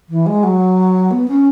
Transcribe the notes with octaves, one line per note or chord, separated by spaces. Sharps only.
E3
G#3
F#3
B3
C#4